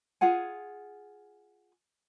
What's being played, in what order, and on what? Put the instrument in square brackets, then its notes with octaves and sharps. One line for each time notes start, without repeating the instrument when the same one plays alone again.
[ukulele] F4 G#4 F#5 G#5